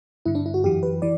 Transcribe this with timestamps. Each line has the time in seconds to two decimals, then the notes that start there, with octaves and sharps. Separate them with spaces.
0.25 G2 D3 E4
0.35 D4
0.46 E4
0.54 F#4
0.64 F#2 E3 G4
0.83 B4
1.02 E3 D5